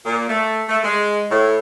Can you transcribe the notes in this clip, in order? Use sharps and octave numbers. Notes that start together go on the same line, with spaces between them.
A#2
A3
A3
G#3
A2